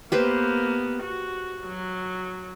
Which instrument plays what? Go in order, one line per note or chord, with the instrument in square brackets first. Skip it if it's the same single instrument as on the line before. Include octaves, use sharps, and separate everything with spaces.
[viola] A#3 B3 [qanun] G4 B4 C5
[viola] F#4
F#3